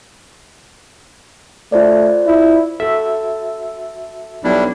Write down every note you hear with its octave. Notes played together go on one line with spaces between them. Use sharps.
A3 F4 C5 D5
E4
F#4 A4 E5
B1 G3 D4 E4